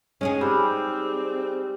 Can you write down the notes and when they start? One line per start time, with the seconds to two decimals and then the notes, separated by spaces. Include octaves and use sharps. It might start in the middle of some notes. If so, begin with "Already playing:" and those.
0.21 G#3 C#4 D#4 G#4
0.41 G3 C4